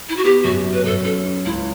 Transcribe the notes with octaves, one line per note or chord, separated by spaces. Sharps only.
E4
F#4
B3 G4
F#2 F#4
F#2
B4
F#2 A4
C#4 A4
C#4
C#2 E4